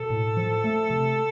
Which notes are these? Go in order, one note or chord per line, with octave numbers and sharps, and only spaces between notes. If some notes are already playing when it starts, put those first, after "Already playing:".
Already playing: B2 A4
A2
F3
A3
C3